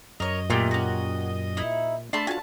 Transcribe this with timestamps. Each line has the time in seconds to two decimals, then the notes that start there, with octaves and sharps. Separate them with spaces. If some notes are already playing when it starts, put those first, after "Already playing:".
0.20 F#2 A#4 C#5 D#5
0.50 A#2 A3 F4 G4 F#5
0.71 C#4 F#4
1.57 D#4 E4
2.13 A3 D4 A5 B5 C6
2.27 F4 F#4 G#5 A5